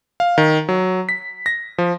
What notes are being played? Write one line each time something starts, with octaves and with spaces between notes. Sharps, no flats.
F5
D#3
F#3
B6
A#6
F3